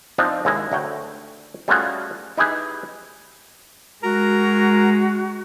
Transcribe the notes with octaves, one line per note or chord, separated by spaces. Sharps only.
F3 C4 D4 D#4 D#5
D#2 G#3 E4 A#5
D2 A3 C#5 F#5 G5
G3 A3 C#4 F4 F#4 G#4
D#4 E4 G4 G#4 B4
G#3 F#4 A#4 A#5